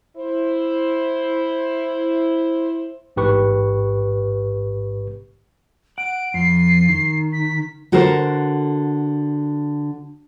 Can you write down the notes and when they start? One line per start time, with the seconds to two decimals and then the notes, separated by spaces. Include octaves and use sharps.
0.17 E4 C5
3.16 A1 G#2 G4 B4 C#6
5.98 F#5 D7
6.34 F2 C7
6.89 D#3
7.33 B6
7.92 D3 F#4 A4 A#4 C5